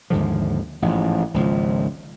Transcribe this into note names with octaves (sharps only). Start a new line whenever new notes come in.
D#2 G#2 D3 F3
A1 G#2 F3
G#1 C#2 F3